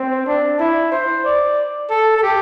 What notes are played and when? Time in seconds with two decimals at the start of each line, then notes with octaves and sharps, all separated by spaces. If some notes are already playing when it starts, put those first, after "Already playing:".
Already playing: C4
0.26 D4
0.60 E4
0.91 C5
1.25 D5
1.90 A4
2.16 A4
2.23 G4